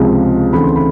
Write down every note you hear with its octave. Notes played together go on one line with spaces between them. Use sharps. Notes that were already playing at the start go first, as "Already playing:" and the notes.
Already playing: C#2 C3 F3 G#3
D2 C#3 E3 A3 C4 B5
C6
B5